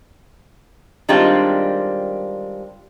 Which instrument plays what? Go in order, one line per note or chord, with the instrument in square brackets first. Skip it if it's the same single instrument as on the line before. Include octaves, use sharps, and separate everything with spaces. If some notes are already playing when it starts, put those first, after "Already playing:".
[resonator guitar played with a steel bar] D#3 G3 G#3 C4 D4 F4